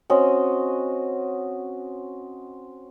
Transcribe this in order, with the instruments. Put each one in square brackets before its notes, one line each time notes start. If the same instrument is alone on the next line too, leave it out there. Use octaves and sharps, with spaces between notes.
[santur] C4 C#4 F#4 D#5